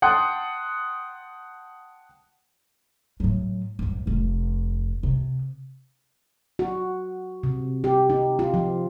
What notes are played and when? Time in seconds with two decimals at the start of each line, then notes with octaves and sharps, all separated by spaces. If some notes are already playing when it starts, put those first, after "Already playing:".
0.02 F#5 G5 A5 C6 D#6 F#6
3.20 A2 F#3
3.79 A1 F#2
4.06 F1 F2
5.03 C3
6.59 F#4
7.43 C3
7.84 G4
8.10 D#4
8.39 F4
8.54 F3